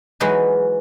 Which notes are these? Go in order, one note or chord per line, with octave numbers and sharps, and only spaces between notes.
E3 F#3 G#3 D#4 G#4 B4